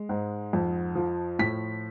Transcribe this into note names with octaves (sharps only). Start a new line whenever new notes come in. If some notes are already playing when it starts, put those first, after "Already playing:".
Already playing: G#3
G#2
F2
F3
A2 B6